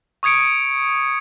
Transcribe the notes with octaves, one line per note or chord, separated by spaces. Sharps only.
C#6 D#6 G#6 C#7 D7